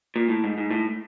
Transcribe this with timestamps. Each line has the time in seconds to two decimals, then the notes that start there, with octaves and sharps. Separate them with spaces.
0.16 A#2
0.29 A2
0.44 G#2
0.58 G#2
0.71 A2